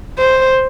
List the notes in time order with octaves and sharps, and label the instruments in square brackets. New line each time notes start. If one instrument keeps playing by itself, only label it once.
[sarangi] C5